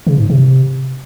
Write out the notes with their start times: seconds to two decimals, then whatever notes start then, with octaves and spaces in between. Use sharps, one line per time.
0.07 C#3
0.18 G#2
0.30 C3